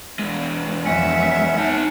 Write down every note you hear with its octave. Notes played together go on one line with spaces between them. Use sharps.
E2 G#3
F2 F#3 C#4 E5 F#5
D#4 A5